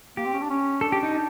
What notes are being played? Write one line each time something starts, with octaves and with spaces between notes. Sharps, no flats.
A#3 G4
C4
C#4
D4
C#4
D4 A4
G4
D#4
D4